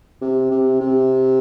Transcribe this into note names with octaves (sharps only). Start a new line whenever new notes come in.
C3
C3
C3